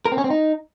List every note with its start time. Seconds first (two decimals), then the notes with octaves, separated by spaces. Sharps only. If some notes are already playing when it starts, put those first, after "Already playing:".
0.05 A#4
0.12 C4
0.18 C#4
0.24 C4
0.30 D#4